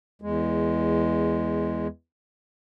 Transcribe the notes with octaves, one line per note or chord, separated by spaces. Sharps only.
E2 G#3